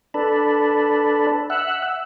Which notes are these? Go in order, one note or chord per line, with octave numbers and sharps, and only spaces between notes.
D4 A4 B4
E5 F#5